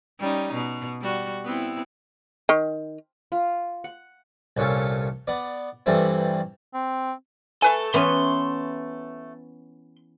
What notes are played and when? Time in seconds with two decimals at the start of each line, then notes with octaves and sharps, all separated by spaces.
0.19 G3 C#4 D#4
0.54 B2
1.01 G3 F#4
1.44 B3 C4 E4
2.49 D#3
3.32 F4
3.84 F#5
4.57 C2 A#2 C#4 F4 A4
5.27 B3 D5
5.86 G2 E3 G3 A3 C4
6.74 C4
7.62 A3 A4 B4 G#5
7.94 E3 B3 C#4 C6